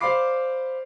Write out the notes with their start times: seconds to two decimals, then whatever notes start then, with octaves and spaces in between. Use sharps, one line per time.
0.01 C5 D5 F5 B5 D6 C7